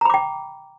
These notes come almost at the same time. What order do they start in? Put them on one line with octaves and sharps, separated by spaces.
A#5 B5 D6 G5